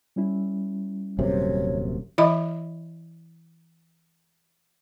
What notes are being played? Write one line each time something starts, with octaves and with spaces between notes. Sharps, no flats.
G3 C#4 E4
D#1 F#2 C3 C#5
E3 E4 D#5 E5 B5